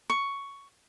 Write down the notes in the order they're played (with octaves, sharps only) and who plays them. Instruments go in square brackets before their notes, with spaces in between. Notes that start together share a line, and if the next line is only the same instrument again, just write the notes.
[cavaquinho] C#6